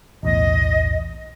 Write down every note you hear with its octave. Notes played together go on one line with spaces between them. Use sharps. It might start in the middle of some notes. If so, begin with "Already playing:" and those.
B1 E2 A2 D#5